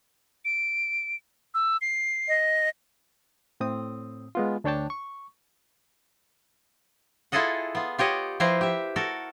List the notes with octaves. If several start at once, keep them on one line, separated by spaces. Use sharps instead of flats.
D7
E6
C7
D#5
A2 C4 D#6
G#3 B3 F4
D2 D4 C#5 G5 A5
C#6
E4 F4 G#4 A4 D#5 F#5
B3 F4
F4 G4 C#5 D#5 F#5
F3 E4 G4 B4 C5 A#5
G4 E5
F#4 A4 A#4